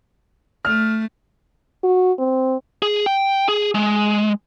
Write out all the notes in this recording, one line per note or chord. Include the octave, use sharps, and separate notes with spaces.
A3 F6
F#4
C4
G#4
G5
G#4
G#3